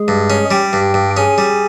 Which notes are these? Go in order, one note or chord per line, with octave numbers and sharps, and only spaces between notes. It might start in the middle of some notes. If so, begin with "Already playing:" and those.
Already playing: G#3 G#4
G2
C#4
G3 G4 G5
G2
G2
C#4 G#4 G#5
G3